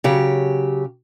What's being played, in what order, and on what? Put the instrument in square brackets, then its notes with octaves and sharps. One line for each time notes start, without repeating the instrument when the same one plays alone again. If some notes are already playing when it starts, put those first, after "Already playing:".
[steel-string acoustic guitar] C#3 F#3 G4